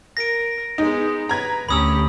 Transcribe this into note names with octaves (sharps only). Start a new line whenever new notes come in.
A#4 A#6 D7
G#3 B3 D#4
B4 A#5 G#6
D2 C#4 G4 B5 D#6 E6